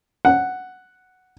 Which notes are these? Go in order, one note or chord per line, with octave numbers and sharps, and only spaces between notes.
F#5